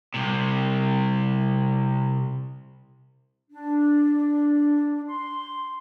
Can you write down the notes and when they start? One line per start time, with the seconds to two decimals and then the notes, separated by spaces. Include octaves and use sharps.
0.14 C2 C3
3.51 D4
5.09 C6